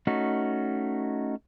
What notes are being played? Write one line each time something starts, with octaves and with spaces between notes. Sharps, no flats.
A3 C#4 D#4 F#4